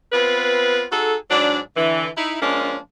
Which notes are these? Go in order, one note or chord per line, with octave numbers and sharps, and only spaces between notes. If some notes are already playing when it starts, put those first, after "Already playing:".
B3 C4 F4 B4
D#4 F#4 G#4 A4
G#2 F#3 D4
D3 E3
D#4 E4
F3 G#3 A#3 C#4 D4